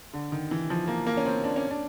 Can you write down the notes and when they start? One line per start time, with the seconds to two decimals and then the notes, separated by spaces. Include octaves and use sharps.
0.14 D3
0.32 D#3
0.51 E3
0.70 F3
0.88 A#3
1.06 A#3
1.17 C#4
1.26 C4
1.44 D4
1.56 C#4
1.71 D4